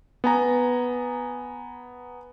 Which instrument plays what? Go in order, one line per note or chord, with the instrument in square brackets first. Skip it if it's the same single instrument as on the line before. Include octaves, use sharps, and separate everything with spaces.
[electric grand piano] B3 G#5 A#5